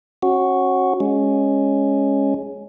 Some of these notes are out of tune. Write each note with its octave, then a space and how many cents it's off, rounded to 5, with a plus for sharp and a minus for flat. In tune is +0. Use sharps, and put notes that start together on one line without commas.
C#4 -30 F#4 +0
G#3 +0 C#4 +0